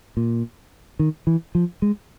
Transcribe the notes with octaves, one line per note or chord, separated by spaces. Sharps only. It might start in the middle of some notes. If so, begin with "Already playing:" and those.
A#2
D#3
E3
F3
G#3